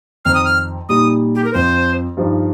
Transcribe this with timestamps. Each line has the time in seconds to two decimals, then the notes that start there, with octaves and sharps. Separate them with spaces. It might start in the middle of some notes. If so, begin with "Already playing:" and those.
0.25 F2 D#3 C4 F6
0.35 D#6
0.45 F6
0.89 A#2 G3 D#4 D#6
1.35 G4
1.45 A#4
1.53 F2 F3 C4 C5
2.17 G2 F3 D#4